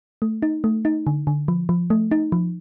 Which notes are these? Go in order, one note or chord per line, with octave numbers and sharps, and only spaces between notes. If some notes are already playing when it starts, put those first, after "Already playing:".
A3
D#4
A3
D#4
D3
D3
F3
F3
A3
D#4
F3